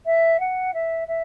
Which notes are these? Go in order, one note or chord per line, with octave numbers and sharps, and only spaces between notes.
E5
F#5
E5
E5